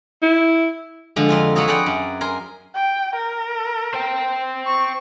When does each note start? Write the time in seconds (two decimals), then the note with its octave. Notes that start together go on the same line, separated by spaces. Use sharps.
0.22 E4
1.16 D3 F3 G#3
1.29 F2 F4 G#5
1.55 F3 F#3 A4 C#5 D#5
1.68 G#4 B4 D5 F#5 G5
1.86 F#2
2.21 A#4 G#5 C6
2.75 G5
3.15 A#4
3.94 C5 G5
4.66 C#6